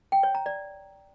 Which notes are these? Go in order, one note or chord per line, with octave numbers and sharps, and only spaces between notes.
G5
C#5
A#5
D5